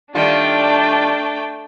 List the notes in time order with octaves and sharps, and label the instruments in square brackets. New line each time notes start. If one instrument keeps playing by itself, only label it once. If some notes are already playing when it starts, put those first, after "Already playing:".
[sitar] D#3 G3 F4 [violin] A3 G5 [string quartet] D4 A5